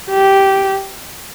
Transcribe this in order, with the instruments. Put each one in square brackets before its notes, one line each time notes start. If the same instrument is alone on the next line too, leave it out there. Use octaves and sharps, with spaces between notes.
[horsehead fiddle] G4